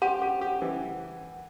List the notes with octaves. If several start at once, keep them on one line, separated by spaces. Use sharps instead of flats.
G4 F#5
G4
G4
E3